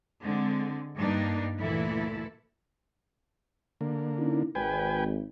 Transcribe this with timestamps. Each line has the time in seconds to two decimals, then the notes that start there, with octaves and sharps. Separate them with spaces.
0.21 D3 G#3 C4
0.97 G2 G3 A#3 D4 D#4
1.60 D2 A#2 E3 E4 A4
3.81 D3 A#3
4.18 C#4 D#4 E4
4.55 G#1 B4 G5 G#5